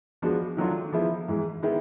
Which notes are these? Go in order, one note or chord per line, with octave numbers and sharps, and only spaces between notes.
F3 G#3 B3 D4 F#4
D#3 F#3 A3 D4 F4
F3 G#3 B3 E4
G#2 E3 G#3
D#3 G#3 B3 E4